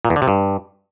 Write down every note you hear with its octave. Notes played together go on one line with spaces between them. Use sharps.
A#2
E2
D3
C3
G2